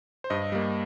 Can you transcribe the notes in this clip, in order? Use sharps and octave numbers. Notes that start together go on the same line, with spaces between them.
C5
G2 D#5
G3 A#3